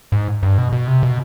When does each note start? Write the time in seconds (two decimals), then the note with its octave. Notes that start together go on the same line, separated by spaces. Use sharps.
0.12 G#2
0.43 G2
0.58 B2
0.72 B2
0.88 C3
1.03 B2